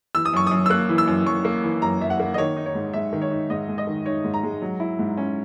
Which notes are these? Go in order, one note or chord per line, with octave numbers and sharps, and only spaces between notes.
E3 E6
D#6
F#2 C#6
D#6
F#2
E6
A#3 F#6
E3
E6
F#2
F#2 C#6
A#3
E3
F#2 A#5
F#2 E5
F#5
A#3
D#5
D#3 C#5
D#4
C#5
G#2
G#3 E5
D#3
C#5
D#4
G#2 D#5
G#3
D#5
D#3
D#4 C#5
G#2
A#5
G#3
F#3
E4
G#2
C#4